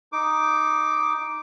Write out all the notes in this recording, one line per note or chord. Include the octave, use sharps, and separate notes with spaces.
D#4 D6